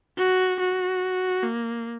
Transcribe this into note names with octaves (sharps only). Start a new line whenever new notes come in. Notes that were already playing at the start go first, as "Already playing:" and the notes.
F#4
F#4
A#3